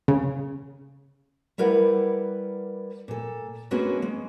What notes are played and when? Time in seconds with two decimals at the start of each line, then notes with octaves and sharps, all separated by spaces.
0.08 C#3
1.58 G3 E4 A#4 B4 D5 F#5
3.08 A#2 A4
3.71 G#3 A#3 B3 C#4 D4 F#4
4.02 G#3